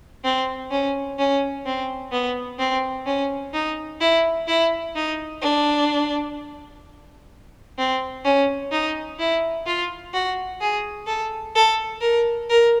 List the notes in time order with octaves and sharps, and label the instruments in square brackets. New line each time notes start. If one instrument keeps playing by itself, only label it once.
[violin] C4
C#4
C#4
C4
B3
C4
C#4
D#4
E4
E4
D#4
D4
C4
C#4
D#4
E4
F4
F#4
G#4
A4
A4
A#4
A#4